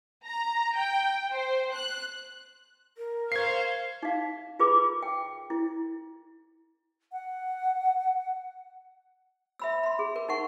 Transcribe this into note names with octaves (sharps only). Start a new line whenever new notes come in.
A#5
G5
C5
F#6
A#4
C5 F5 C#6 G#6 C7
D#4 F5
F4 G#4 B4 B5 D6
G5
E4
F#5
E5 B5 E6
B5 C6
G#4
A#4
D#4 A#4 F#5 C#6